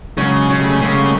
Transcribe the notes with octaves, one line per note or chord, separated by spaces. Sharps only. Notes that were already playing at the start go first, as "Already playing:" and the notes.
C#3 F#3 G#3
F#3 G#3
C#3
G3 A3
C#3 G#3 A#3
G3 A3